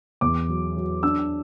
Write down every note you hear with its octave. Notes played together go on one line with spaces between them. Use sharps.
E2 D6
F#3
F#3
D4 E6